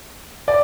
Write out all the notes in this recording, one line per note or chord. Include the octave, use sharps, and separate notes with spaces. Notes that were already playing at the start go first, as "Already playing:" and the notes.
D5